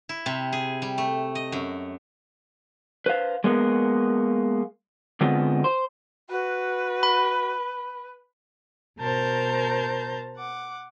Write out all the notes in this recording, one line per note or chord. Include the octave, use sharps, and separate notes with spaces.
E4
C3
G#4
G3
A3
D#5
F#2
B4 C5 F5
G#3 A#3 B3
D3 G#3 B3 C4 F4
C5
F#4 B4
B5
B2 A#4 C5 A5 A#5 G6
F#5 D6